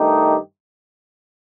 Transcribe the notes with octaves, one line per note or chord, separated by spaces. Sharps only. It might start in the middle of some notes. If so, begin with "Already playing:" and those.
Already playing: G2 D#3 A3 D#4 G4